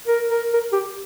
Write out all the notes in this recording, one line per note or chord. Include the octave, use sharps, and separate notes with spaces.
A#4
A#4
A#4
G4